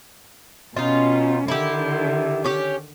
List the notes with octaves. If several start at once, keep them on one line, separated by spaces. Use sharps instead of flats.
B2 C#4 D#4 F4
D3 D#3 E4 G4
C#4 G4